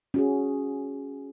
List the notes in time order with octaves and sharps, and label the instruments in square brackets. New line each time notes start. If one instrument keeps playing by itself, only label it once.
[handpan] C#4 F#4 G#4